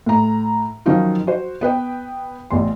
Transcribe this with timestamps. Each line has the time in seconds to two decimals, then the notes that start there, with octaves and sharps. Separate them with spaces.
0.06 A2 A#5
0.86 D#3 F3 F#3 C#4 D#4 F4
1.27 F#4 C5
1.61 B3 B4 G5
2.50 A1 E2 C6